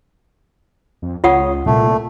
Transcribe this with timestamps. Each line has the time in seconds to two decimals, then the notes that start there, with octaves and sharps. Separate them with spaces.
1.02 F2
1.24 C#2 F4 C#5 F#5 D#6
1.66 C2 A#2 A3